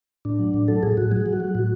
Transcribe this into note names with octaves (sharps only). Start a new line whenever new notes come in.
A2 D4
F#3
A2
F#3 A4
A2 G#4
A2 F#4
F#3 G#4
F#3
F#4
F#3
A2 F#4